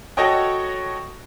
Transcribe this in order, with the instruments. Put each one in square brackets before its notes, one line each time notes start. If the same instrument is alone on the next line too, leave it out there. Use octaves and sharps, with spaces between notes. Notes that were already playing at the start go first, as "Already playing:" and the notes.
[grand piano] F#4 A4 C#5 D#5 G5